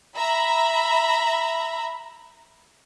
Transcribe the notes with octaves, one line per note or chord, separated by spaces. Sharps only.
E5 A#5 B5